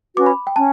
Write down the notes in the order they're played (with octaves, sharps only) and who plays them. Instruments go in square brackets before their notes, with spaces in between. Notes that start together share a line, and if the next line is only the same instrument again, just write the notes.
[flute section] C#4 F#4 B4 [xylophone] D6
[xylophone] B5
G5
[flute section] C#4 [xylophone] A5